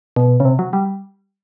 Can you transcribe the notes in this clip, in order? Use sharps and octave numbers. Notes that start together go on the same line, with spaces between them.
B2
C#3
C3
F#3
G3